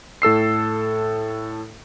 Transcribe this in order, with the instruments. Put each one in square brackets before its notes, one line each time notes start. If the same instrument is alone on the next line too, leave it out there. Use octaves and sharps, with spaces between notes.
[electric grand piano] A2 A4 E6 C7